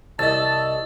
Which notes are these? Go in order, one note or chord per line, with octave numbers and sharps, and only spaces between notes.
C2 D#5 A5 E6 A6